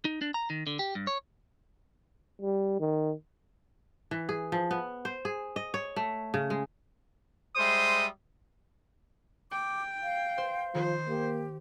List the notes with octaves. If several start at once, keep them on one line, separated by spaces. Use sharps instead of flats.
D#4
D4
A#5
D#3
D3
G4
G2
C#5
G3
D#3
E3
G#4
F3
B3
C5
G#4
D#5
C#5
A3
C#3
G#3
G3 G#3 C5 E5 C6 D#6
G5 D6
F5
C5
D#3 F3 C5
A#3 G4